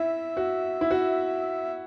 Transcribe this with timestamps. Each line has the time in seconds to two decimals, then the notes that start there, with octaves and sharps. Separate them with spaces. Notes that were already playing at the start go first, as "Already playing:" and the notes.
Already playing: E4 E5
0.37 F#4
0.81 E4
0.91 F#4